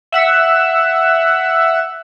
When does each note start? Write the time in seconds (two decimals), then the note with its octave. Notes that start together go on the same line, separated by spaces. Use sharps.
0.12 E5 F#5 E6